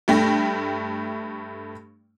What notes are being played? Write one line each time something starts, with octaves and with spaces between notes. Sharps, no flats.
G2 A3 G5 A#6